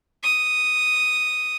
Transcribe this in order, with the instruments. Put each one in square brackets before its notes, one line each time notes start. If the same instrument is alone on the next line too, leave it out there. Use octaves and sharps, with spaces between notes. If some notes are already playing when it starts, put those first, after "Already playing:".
[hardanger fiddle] D#6